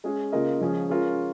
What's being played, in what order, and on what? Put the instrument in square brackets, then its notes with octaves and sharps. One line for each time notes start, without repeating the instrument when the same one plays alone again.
[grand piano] G#3 C#4 G#4
C#3 A#3 F4 A#4 D#5
C#3 F3 G#3 C#4 G#4
G#3 C#4 F4 A#4